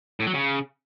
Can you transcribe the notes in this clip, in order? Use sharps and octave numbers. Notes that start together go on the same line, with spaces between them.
A2
F#3
C#3